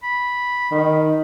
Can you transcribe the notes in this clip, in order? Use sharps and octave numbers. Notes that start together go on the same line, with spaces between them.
B5
D#3